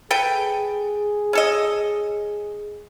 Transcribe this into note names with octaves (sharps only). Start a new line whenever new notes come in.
G#4 A4 B4 G5
C#4 A4 D#5